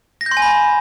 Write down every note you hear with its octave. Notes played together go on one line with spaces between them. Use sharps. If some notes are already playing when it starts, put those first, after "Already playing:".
A#6
G6
C6
G#5
B5